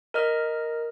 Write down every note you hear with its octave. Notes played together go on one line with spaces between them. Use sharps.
A#4 D#5 F6